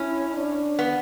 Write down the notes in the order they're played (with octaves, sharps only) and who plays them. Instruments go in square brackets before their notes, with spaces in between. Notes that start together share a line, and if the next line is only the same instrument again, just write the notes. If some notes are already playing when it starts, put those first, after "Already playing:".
Already playing: [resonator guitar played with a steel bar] C#4 [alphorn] E4
[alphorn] D4
[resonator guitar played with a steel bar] B3